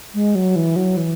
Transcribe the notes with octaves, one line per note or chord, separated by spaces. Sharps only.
G#3
F#3
E3
F#3
E3